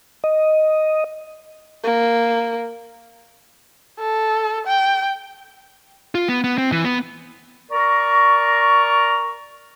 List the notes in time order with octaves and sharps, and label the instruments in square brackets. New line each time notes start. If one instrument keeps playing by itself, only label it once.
[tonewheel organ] D#5
[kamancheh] A#3
[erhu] A4
G5
[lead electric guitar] F4
B3
B3
C4
E3
B3
[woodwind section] A#4 D5 A#5 C#6